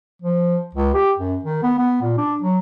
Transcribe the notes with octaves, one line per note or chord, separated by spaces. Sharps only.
F3
C#2
G4
F#2
D#3
B3
B3
A#2
D4
F#3